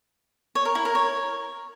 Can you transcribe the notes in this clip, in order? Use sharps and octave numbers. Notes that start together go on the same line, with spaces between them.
C#5
A#4
E4
A#4
C#5